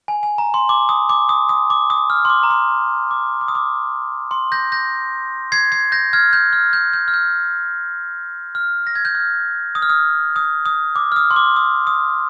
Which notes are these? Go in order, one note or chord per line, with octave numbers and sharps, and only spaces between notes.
G#5
G#5
A#5
C6
D6
D#6
D6
D#6
D#6
D6
D#6
F6
C6
D6
A#5
C6
D6
D6
D#6
D6
C6
G6 A#6
G6 A#6
G#6 C7
G#6 C7
G6 A#6
F6 G#6
G6
F6
G6
G6
F6
G6
F6
A#6
G#6
G6
F6
D#6
F6
D#6
D#6
D#6
D6
F6
D#6
C6
D6
D#6
D#6